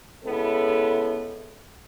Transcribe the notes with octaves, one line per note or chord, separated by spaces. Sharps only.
C#3 G#3 B3 E4 A4